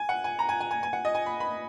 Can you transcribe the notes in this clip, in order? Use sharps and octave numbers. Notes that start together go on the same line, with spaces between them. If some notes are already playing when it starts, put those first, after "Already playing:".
Already playing: G#5
F#5
G#5
A#5
G#5
G#5
G#5
G#5
F#5
D#5
G#5
B5
B5